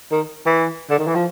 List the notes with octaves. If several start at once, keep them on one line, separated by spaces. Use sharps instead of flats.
D#3
E3
D3
D#3
E3
F3